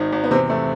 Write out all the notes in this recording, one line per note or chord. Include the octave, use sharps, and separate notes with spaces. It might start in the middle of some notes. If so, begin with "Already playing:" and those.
Already playing: G#1 D#3 D#4
G#1
B3
E2 C3 C4
E2 A3